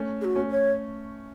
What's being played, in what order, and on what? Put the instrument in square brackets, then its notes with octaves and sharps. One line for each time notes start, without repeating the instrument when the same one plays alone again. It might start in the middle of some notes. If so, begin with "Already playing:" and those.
Already playing: [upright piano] A3 C#4
[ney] G#4
F#4
[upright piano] A3 C#4
[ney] C#5